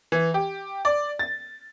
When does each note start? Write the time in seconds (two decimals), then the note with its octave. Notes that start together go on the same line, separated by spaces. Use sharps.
0.12 E3
0.34 G4
0.85 D5
1.19 A6